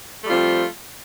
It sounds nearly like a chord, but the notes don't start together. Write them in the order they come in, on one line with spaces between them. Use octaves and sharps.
A3 G3 F4 C4 F3